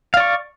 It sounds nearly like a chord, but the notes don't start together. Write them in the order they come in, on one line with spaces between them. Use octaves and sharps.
F5 D5 C#6